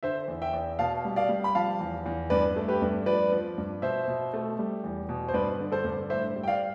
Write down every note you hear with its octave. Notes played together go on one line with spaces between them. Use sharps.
D3 C5 E5
E2
E5 G5
E2
B2 F5 A5
G3
D5 F5
G3
B5
F3 F5 A5
E2
E2
G2 B4 D5
A3
G4 B4
G2
F3 B4 D5
F3
G2
B2 C5 E5
B2
A3
G3
E2
B2
C5
G2 B4 D5
D3
A4 C5
G2
A2 C5 E5
G3
G5
D5 F5